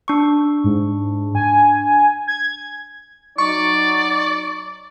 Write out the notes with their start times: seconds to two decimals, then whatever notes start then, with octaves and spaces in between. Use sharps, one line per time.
0.08 D4 C#6
0.64 G#2
1.35 G#5
2.27 G#6
3.38 F#3 D#4 D5 C#6